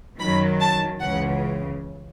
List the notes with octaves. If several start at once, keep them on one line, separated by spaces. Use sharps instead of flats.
F#2 D#3 F#3 B5
A5
C#2 C#3 E3 F#5